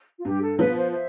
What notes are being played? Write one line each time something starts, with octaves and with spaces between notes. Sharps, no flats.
F4
G2 G4
A4
F3 B3 B4
C5
C5 E5